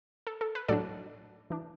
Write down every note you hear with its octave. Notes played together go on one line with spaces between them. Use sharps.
A4
A4
B4
A2 F#3 D4 A4 D5
E3 D4